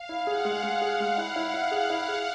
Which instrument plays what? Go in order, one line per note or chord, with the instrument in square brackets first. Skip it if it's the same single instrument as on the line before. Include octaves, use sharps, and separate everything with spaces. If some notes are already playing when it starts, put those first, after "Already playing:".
Already playing: [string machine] F5
[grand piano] E4
[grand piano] G#4 [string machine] F#5
[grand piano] G#3
[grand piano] G#3 [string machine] F#5
[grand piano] G#4
G#3
E4
E4
E4
G#4
E4
G#4